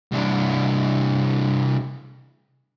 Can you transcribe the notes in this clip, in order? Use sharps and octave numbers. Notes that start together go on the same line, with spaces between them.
C2 D4